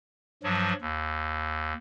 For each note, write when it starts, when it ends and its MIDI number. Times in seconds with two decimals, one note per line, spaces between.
0.43 0.73 43
0.43 0.73 53
0.43 0.73 54
0.81 1.73 39